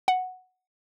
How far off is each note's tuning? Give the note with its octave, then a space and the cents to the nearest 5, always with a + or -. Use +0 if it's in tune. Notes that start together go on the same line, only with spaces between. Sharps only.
F#5 +0